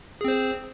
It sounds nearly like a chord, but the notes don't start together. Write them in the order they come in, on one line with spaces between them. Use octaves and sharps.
G#4 C4 C5